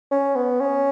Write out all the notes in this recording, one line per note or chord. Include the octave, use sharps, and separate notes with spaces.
C#4
B3
C#4